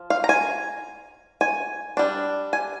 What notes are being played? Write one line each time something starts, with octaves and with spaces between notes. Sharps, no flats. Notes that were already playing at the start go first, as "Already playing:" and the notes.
Already playing: F3
F5
A#5
G#5
G#5
G3 D4
G#5